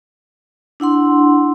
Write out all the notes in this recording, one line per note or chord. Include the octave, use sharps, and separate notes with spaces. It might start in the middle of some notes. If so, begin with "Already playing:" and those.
D4 E4 F#5 C6